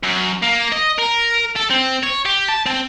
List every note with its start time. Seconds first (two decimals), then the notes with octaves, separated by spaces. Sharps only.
0.04 F#2
0.42 A#3
0.72 D#5
0.99 A#4
1.56 A4
1.70 C4
2.03 C#5
2.26 G4
2.49 A5
2.66 C4